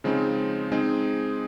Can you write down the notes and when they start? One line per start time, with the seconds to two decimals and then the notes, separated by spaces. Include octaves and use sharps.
0.04 C#3 F3 G#3 C4 D#4
0.72 G#3 C4 D#4 G#4